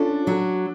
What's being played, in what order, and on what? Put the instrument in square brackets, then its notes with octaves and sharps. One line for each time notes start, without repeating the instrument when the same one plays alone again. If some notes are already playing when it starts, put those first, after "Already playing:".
Already playing: [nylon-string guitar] C#4 F4 A4 [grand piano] D4
[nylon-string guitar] F#3